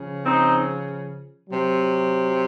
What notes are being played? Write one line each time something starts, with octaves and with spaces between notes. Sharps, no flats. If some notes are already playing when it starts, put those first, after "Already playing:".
Already playing: C#3 F3
C4 D#4
C3 F#3